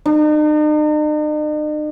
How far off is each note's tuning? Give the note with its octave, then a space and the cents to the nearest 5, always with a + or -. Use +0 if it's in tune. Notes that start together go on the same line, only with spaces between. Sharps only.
D#4 -45